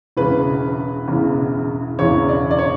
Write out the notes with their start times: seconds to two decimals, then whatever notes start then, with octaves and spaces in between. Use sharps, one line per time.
0.17 E1 E2 C#3 E3 B4
1.08 E1 E2 C#3 E3
1.99 E1 E2 C#3 E3 C#5
2.29 D5
2.51 D5
2.59 C#5